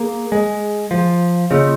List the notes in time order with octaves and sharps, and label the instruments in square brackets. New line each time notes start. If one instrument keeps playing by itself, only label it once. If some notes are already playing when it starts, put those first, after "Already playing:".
Already playing: [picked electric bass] A#3 [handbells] G#4
[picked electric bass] G#3
F3
[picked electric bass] C#3 [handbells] A#3 F4 G#4 D#5